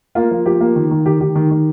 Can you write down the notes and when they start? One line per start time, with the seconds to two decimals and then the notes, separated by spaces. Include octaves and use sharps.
0.15 A#3 F4 A#4
0.31 F3
0.46 F3 G4
0.61 A#3
0.76 D#3
0.91 D#3
1.06 D#3 G4
1.21 D#3 G4
1.35 D#3
1.51 D#3